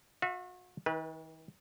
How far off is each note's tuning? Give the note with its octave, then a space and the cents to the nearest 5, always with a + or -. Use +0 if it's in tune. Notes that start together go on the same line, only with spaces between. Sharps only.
F#4 -40 E5 +15
D#3 +45 B4 -20